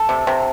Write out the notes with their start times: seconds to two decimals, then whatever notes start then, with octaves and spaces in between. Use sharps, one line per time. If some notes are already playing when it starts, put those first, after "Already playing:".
Already playing: A4
0.09 C3
0.27 C3